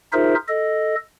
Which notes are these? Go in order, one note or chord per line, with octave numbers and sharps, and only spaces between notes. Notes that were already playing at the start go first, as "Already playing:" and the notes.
D#4 F4 G#4 A#4 C5 E5
A4 D#5